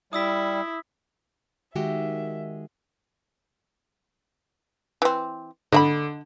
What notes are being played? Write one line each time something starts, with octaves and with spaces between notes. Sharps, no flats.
G3 E4 D#6 E6 B6
D#3 G#3 F#4 G4 E5
E3 C4
D3 D#5 E5 B5